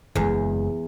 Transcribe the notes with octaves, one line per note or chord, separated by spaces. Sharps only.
F#1 E2 G#3